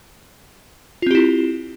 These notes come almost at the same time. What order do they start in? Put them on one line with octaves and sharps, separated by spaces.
F4 C4 G4 E4